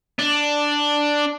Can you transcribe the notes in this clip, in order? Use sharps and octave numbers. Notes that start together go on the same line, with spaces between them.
D4